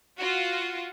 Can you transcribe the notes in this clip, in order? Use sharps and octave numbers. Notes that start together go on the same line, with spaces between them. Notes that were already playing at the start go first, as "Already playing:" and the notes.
F4 F#4